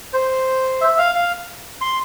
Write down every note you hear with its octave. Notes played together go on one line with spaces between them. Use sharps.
C5
E5
F5
F5
C6